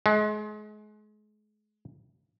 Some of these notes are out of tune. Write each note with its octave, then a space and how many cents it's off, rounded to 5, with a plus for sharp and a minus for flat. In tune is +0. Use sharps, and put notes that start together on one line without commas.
G#3 +35